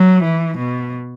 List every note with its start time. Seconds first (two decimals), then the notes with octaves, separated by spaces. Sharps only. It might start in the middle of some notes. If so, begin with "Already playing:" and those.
Already playing: F#3
0.24 E3
0.58 B2